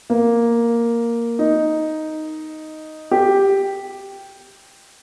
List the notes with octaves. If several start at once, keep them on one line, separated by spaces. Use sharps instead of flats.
A#3
D#4
G4